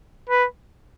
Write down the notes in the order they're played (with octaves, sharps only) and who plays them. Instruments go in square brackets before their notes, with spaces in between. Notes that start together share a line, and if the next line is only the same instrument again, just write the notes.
[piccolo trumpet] B4